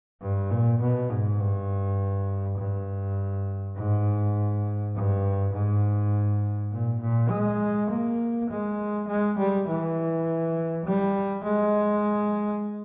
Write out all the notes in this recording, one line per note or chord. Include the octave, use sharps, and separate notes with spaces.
G2
A#2
B2
G#2
G2
G2
G#2
G2
G#2
A#2
A#2
G#3
A#3
G#3
G#3
G3
E3
G3
G#3